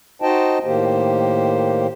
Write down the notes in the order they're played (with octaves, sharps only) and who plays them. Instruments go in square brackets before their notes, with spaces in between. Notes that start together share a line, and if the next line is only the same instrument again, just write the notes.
[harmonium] D#4 F#4 C5 D#5 G5 A5
A2 D#3 A#3 G4 C5